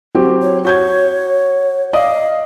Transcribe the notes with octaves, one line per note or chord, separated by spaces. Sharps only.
F#3 C4 G4
C#5
F#4 C#5 G6 G#6
D5 D#5 F5 D#6